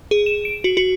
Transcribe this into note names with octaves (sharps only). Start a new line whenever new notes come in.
G#4
E7
D7
F#4
F#4